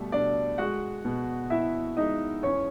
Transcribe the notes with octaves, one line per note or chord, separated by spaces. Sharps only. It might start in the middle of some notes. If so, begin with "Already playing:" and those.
Already playing: B2 G3 A3 A4
B2 D4 D5
G#3 F#4 F#5
B2
B2 E4 E5
G#3 D#4 D#5
E2 C#4 C#5